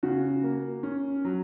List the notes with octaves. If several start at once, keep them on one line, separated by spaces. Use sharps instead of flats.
C#3 F#4
A#3
C#4
F#3